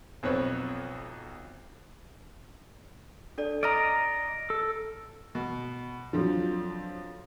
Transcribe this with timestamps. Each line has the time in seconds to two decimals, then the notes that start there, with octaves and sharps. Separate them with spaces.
0.23 B1 F2 F3 B4 C#5
3.38 D4 A4 D5
3.63 D5 D#5 A#5 F6 A#6 D7
4.50 A4
5.35 B2
6.13 F2 F3 F#3 D4